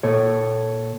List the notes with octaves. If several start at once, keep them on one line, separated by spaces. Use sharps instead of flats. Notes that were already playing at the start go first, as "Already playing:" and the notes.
A#2 A4 C#5